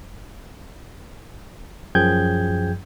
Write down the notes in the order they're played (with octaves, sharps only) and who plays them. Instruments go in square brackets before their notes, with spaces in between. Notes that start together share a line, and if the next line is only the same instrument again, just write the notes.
[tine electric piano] F#2 F3 G#4 G5 G6 G#6